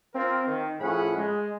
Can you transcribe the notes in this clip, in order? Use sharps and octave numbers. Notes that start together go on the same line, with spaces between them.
C4 F4 A#4
D#3
A2 F3 C#4 G#4 F#5 B5
G#3